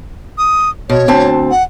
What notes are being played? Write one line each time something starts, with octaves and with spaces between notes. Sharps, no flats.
D#6
B2 C#5
D2 C4 A5
F#5